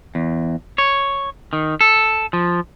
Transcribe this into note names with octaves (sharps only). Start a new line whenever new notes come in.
E2
C#5
D#3
A4
F3